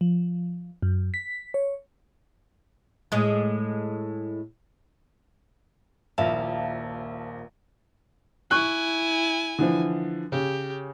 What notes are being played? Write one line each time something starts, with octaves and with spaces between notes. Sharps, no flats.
F3
F#2
B6
C#5
A2 G#3
D#1 A#1 A#3 E4 E5 F5 A5
E4 G#5 C#6 F#6
D3 E3 F3
C#3 G4